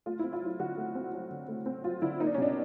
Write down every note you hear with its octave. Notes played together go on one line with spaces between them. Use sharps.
A3 F4
C4 E4
F4
F#3 E4
D3 F#4
A3
C4
F#3
D3
A3
C4
F#3 F4
D3 E4
A#3 D#4
D4
C#4
B2 D4